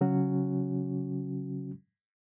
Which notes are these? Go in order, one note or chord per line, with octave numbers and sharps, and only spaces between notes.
C#3 F#3 C#4 F#4